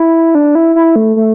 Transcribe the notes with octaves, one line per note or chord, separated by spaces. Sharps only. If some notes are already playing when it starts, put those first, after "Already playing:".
Already playing: E4
D4
E4
E4
A3
A3